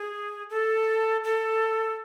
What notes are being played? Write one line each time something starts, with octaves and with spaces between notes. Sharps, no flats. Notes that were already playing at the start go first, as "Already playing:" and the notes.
Already playing: G#4
A4
A4